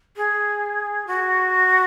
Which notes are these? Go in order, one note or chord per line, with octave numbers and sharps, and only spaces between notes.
G#4
F#4